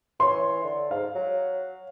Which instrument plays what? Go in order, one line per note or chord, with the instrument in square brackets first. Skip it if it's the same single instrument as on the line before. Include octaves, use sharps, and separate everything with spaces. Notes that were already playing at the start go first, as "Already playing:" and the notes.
[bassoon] E3 [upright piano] C#5 C6
[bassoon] D3
[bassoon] G#2 [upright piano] F5
[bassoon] F#3